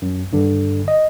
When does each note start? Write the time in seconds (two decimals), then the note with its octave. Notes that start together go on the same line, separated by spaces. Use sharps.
0.02 F#2
0.32 G#1 G2 D3
0.88 D#5